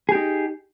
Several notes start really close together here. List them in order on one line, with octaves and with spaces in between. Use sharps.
G#4 G4 D#4